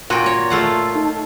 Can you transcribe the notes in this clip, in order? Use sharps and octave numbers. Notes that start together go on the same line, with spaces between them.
A#2 F#4 G5
C#5
A3 F4 F#5
D#4